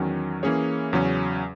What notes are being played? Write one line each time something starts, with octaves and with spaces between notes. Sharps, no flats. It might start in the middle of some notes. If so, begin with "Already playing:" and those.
Already playing: E2 D#3 F#3 C#4
E3 A#3 C#4 G#4 C#5
E2 C#3 F#3 C#4